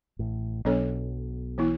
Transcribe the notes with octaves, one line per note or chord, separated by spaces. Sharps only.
A1 A2
B1 B2 F#3 B3 D4 A4 C#5
E3 B3 E4